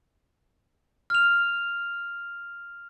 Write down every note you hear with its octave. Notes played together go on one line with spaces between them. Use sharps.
F6 F7